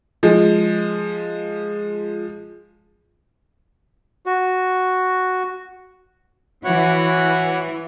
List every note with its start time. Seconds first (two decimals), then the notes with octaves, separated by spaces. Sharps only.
0.23 F3 G#3
4.26 F#4
6.64 E3 F#4 C#5 F#5